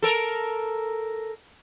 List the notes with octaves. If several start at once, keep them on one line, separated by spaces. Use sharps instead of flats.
A4 A#4